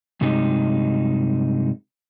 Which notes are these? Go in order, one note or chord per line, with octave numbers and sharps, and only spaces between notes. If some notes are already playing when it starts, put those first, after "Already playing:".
G2 C3 F#3 G#3 D#4